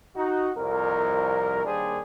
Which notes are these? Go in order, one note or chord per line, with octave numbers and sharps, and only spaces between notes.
D#4 F#4
C2 F2 A#4
D#2 G3 A#3 D4 G#4 C5